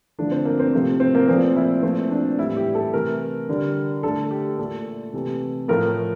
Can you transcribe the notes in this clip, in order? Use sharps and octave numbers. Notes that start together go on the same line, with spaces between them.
D3 F3 A3 D4
C4
A#3
C4
C3 F3 A3
C4
A#3
A#2 F3 A3 C4
E4
A#2 F3 A3 C4
D4
A2 E3 G3 E4
G4
A4
C3 E3 A3 A#4
D3 G3
D3 A3 A4
G4
A#2 A3 A4
C3 E3 A3
A2 F3 A3 A#4